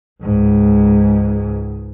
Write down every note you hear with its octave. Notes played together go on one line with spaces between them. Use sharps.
C#2 G#2